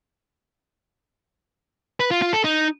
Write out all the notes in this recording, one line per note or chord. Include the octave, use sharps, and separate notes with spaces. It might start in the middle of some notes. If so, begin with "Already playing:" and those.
B4
F4
F4
A4
D#4